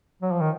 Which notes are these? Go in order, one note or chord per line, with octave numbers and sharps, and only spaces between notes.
F#3
F3
D#3